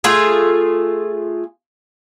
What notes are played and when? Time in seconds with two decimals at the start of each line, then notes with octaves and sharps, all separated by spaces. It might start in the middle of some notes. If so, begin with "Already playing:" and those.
0.04 A3 F4 G#4